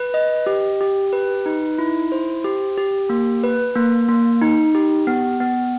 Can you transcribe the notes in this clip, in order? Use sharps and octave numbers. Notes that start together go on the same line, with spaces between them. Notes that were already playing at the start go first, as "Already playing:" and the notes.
Already playing: B4
D#5
G4
G4
B4
D#4
E4
C5
G4
G4
A#3
B4
A#3
A#3
D#4
G4
B3
B3